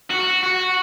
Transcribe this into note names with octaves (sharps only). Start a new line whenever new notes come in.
F#4
F#4